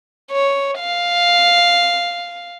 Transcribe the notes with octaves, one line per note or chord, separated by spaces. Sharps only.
C#5
F5